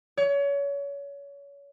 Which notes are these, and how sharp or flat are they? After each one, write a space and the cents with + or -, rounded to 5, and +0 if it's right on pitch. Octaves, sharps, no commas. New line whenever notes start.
C#5 +30